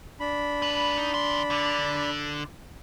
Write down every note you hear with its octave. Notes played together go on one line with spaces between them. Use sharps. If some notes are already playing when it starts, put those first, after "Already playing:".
D4 B5
G#2 B4
D#4
D#3 C6
D3